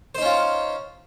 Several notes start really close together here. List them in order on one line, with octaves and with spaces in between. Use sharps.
C5 D#4 C#4 F4